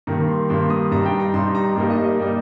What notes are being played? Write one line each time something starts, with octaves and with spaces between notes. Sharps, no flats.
G2 D#3 A#3 A#5
C6
G2 D#3 A#3 C6
D#6
G2 G3 D#4 A#5
G5
A#5
G2 G3 D#4 C6
A#5
G2 G3 A#3 D#4
D#5
D#5
G3 A#3 D#4